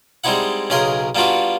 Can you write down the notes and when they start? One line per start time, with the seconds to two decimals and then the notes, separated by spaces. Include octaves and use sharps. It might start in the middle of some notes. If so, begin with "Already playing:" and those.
0.24 G3 G#3 C4 D#4 E4 F#5
0.70 B1 C#3 G#4 A#4 C6
1.15 G3 A#3 B3 D4 F4 F#4